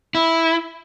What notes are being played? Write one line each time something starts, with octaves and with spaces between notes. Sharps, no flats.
E4